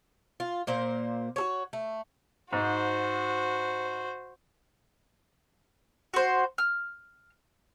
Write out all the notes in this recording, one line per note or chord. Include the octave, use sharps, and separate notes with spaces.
F4
A#2 A#3 C5
F#4 A4 C#5
A3
G#2 F#4 C5
F#4 C5
F6